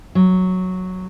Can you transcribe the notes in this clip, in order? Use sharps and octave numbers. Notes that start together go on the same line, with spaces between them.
F#3